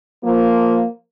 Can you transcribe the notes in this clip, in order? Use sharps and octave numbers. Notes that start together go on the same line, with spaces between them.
F3 A#3